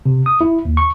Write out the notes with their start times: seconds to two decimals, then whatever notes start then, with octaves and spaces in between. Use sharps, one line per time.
0.06 C3
0.26 D#6
0.41 E4
0.65 D#2
0.77 C#6